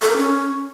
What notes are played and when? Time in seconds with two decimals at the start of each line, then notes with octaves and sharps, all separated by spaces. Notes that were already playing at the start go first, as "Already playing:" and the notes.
0.02 A4
0.09 A#4
0.17 C#4